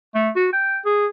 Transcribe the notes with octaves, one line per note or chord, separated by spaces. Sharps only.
A3
F#4
G5
G#4